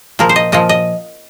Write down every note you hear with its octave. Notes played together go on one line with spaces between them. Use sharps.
A#2 F3 A#4
C5
D#5
A#2 F3 D#5
D#5